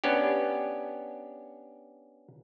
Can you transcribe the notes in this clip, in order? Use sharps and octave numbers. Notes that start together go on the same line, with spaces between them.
B3 C#4 D4 G4